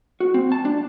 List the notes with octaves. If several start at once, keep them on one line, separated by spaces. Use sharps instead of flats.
F#4
C4
A5
D4